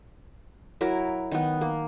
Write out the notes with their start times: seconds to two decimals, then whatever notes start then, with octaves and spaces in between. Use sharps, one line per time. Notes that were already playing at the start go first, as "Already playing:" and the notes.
0.81 F#3 E4 A#4
1.31 D#3 B3
1.61 A#3